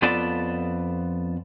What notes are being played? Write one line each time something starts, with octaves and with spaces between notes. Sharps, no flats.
F2 B3 F4 A4 D5 A5